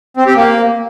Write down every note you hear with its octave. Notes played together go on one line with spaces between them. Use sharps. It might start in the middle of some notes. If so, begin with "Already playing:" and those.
C4
G4
A#3